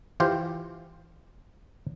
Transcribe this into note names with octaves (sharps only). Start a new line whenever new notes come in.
E3 F4 G4 C5